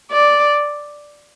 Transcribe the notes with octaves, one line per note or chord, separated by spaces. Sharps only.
D5